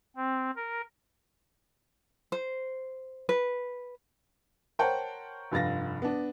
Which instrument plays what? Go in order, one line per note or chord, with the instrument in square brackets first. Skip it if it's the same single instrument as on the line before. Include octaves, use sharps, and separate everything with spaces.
[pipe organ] C4
A#4
[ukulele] C5
B4
[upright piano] A#4 C5 C#5 F#5 G5 A5
F1 G2 F4 A6 A#6
B3 D4